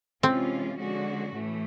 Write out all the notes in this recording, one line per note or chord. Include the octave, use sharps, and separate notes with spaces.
C3 E3 G#3 C4 C#4 F4
D3 F3 G#3 C#4 F#4
A2 E3 A3